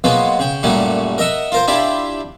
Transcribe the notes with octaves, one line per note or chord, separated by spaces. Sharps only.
F#3 G#3 A#3 B3 F4
C#3 G5
F#2 A#2 F#3 G3 A3 C#4
A#4 D#5 E5 F#5
F4 A#4 C5
D4 E4 F4 G4 D5